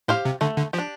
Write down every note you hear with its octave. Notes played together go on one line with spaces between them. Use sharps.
A2 G4 C5 F5
C3
D3 A3
D3
F3 G4
D4